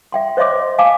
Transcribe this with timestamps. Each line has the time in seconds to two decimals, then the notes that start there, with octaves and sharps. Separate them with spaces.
0.12 E5 G5 C6
0.37 C5 C#5 D#5 E5 C6 D6
0.79 F5 G#5 A5 D6